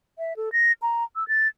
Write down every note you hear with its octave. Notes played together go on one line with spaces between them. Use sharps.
E5
A4
A#6
A#5
E6
A6